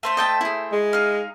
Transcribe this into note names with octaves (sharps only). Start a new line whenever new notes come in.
A3 C5 E5
D#5 G5 A5
E4 G#4
G#3
D#4 F5